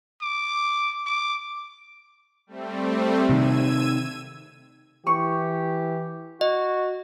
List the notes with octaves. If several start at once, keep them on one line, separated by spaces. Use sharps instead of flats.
D6
D6
G3 A3 C4
C3 D#3 E6 G#6 D#7
E3 G4 C#6
F#4 D#5